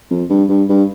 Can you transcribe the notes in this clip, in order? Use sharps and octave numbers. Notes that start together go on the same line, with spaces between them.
F2
G2
G2
G2